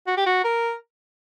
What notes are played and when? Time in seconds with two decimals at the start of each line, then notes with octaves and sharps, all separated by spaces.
0.07 F#4
0.17 G4
0.26 F#4
0.44 A#4